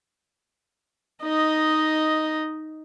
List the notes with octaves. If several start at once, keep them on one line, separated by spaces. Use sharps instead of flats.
D#4 D#5